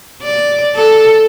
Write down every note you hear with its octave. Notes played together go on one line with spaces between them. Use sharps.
D5
A4